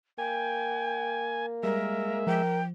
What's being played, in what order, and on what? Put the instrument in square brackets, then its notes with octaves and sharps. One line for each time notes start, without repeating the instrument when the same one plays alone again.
[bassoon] A#3 [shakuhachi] G5 [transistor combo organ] G#5
[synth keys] G3 [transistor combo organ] G#3 E5 [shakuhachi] A#4
[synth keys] F3 [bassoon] A#4 [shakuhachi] G5